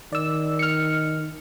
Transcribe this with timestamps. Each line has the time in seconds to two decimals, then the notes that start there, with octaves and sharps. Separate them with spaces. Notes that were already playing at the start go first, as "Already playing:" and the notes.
0.13 D#3 D5 E6
0.59 F6 C#7